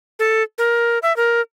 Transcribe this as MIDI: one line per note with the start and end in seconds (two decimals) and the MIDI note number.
0.19 0.43 69
0.58 0.98 70
1.02 1.15 76
1.16 1.41 70